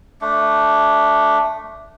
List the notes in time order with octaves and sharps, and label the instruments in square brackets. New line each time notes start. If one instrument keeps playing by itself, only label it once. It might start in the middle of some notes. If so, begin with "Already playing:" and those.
[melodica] A3 D4